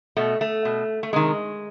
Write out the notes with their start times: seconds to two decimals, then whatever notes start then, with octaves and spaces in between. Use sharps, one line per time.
0.17 B2 A3
0.41 A3
0.65 B2
1.03 A3
1.13 C3 D#3 G#3